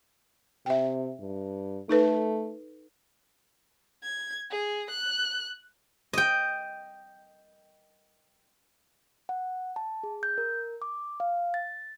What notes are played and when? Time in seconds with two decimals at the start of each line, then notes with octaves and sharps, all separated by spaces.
0.66 C3 E5 G5
1.20 G2
1.89 A3 D#4 A4 B4
4.03 G#6
4.51 G#4
4.90 F#6
6.13 D#5 G5
9.29 F#5
9.76 A5
10.03 G#4
10.23 G6
10.38 A#4
10.82 D6
11.20 F5
11.54 A6